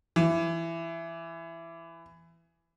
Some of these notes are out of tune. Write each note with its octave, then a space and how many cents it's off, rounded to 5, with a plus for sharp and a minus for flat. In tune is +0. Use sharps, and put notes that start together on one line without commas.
E3 +15